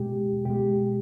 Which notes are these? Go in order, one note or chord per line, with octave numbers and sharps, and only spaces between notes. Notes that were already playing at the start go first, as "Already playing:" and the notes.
Already playing: B2 G#3 G4
B2 G#3 G4